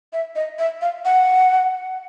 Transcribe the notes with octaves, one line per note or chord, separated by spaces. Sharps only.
E5
D#5
E5
F5
F#5